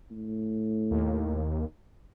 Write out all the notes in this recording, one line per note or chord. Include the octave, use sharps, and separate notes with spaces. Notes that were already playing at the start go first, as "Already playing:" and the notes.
A2
D#2